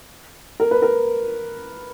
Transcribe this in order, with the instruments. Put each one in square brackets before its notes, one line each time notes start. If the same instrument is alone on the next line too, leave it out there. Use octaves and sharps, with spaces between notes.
[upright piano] A#4
B4
A#4